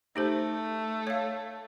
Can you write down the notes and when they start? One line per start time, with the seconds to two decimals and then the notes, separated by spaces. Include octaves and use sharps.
0.16 A3 D#4 G4 C5
1.07 C#5 F5